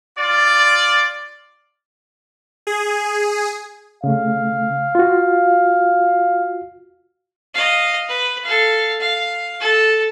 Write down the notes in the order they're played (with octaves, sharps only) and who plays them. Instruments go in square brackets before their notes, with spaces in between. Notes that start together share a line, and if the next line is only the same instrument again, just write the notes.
[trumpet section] F4 D5
[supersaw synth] G#4
[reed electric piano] C#3 A3 [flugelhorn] F5
[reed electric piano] F4 F#4
[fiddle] D#5 F5
B4
A4 F5
F5
A4